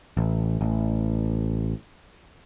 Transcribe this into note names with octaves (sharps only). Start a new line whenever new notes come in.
A1
A1